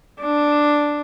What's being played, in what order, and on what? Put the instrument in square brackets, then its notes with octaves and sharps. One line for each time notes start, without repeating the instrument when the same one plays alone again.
[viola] D4